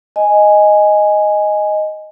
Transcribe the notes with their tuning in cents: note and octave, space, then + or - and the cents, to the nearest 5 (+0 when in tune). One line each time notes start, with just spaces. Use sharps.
D#5 +0 G#5 +0